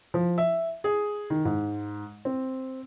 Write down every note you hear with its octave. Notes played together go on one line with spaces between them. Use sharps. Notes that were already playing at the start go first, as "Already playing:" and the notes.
F3
E5
G#4
D#3
G#2
C4